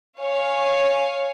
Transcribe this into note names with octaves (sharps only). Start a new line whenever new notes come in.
C#5 F5 G#5 C#7